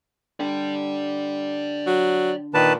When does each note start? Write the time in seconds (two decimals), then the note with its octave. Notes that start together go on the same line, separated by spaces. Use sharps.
0.40 D3 D5 G5
1.87 F#3
2.54 A#2 D#3 B4 A5